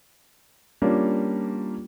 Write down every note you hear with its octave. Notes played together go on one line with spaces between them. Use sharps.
G3 A#3 C#4 D4 F4